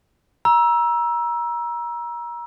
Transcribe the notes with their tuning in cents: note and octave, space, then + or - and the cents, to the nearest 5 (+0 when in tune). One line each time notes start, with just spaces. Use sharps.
A#5 +30 E6 +0